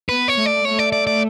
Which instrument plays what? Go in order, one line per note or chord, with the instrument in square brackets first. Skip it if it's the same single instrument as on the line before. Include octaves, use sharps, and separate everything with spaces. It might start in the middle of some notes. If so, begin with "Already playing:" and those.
[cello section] B3 [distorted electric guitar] B4
[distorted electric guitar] C#5
[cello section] A3
[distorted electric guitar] D5
[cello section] A3 [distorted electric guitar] C#5
[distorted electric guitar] D5
D5
D5